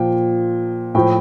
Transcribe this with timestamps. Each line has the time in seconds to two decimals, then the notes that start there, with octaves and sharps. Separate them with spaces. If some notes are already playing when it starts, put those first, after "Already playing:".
Already playing: A#2 F3 G5
0.95 A2 F3 G5